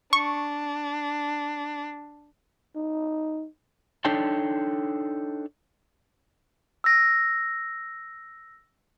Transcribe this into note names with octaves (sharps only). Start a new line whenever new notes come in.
D4 C#6
D#4
D4 D#4 A4 C#5 G5 A5
E6 A#6